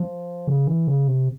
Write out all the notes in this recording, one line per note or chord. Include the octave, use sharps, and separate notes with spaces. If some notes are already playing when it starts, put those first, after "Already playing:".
Already playing: F3
C#3
E3
C#3
C3